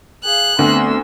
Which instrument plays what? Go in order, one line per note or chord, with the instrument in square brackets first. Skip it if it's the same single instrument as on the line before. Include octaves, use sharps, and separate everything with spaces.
[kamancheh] G#4 F5 [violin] F#6
[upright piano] D2 [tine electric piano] A3 B3 C4 [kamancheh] C6 E6